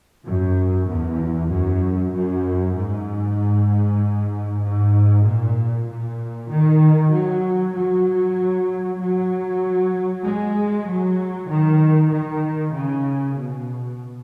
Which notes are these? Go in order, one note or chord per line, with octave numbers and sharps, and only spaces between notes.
F#2
E2
F#2
F#2
G#2
G#2
A#2
A#2
D#3
F#3
F#3
F#3
G#3
F#3
D#3
D#3
C#3
B2